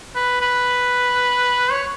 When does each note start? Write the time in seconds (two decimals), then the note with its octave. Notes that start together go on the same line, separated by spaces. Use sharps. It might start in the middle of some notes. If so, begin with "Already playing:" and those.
0.15 B4
0.41 B4
1.71 C#5